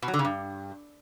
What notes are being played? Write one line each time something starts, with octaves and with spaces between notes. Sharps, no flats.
B2
F#3
D3
C#3
G2